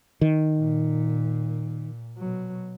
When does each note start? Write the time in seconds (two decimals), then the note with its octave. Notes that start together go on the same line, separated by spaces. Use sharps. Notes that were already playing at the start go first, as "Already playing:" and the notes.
0.21 D#3
0.57 A#2
2.18 B2 F#3